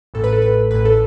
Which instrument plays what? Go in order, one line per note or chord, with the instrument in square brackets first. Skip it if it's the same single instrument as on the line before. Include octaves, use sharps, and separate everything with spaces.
[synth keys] A1 A2 A4
B4
A4
A1 A2 B4
A1 A2 B4
A4